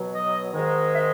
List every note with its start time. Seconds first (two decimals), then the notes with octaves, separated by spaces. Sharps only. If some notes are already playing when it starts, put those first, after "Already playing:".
Already playing: B2 F#3
0.13 D#5
0.53 G#2 D#3 G#3
0.92 E5